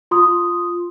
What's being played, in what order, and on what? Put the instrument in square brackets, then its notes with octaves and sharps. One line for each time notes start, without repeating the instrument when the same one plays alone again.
[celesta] F4 C6 D#6